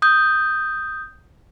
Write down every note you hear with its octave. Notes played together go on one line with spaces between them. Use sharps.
D#6 G6